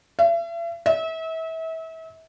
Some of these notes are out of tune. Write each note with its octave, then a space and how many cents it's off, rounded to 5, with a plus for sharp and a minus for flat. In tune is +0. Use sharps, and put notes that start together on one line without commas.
E5 +45
E5 -30